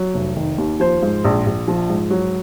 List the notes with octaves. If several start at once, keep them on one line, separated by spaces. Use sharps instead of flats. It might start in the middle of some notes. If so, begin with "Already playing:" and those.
Already playing: F#3
F1
D#3
D#2
F3 C5
G#2
A#1
A#1
F3
G#2
F#3